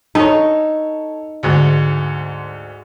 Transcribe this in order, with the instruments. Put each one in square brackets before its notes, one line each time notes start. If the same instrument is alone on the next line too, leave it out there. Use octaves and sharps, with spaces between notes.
[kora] D#4 [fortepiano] A4 C#5
[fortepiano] D2 G#2